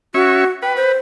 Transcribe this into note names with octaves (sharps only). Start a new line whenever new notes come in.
C#4 F#4 E5 C#6
B4 G5
C5